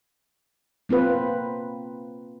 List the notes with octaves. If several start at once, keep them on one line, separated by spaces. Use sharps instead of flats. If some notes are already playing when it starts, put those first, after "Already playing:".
A#3 C4 F4 B4